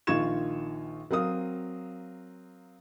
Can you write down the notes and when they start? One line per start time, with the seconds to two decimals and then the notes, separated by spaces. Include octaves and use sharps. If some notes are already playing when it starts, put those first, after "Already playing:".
0.07 A#1 D#3 F4 C#6 G#6 E7
1.11 F#3 C4 A#4 F5 D#6